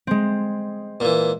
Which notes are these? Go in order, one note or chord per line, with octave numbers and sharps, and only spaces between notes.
G#3 C4
A#2 E3